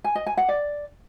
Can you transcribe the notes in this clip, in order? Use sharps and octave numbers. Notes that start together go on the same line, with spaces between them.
G#5
D#5
G#5
F#5
D5